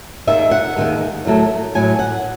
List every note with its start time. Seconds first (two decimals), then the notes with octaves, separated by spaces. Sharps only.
0.27 D#2 D#3 G#3 E5
0.51 F#5
0.77 D#2 D#3 G#3
1.25 A2 F#3 A3
1.75 A2 F#3 A3 G#5
1.99 F#5